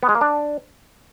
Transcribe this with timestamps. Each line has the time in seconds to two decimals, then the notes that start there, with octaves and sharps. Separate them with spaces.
0.03 B3
0.09 G#3
0.15 A#3
0.21 D4